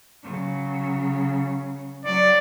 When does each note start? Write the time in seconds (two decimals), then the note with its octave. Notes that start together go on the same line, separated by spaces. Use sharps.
0.23 C#3 F#3
2.05 F#3 D5